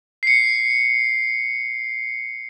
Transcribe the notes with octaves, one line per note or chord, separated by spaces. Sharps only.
C7 C#7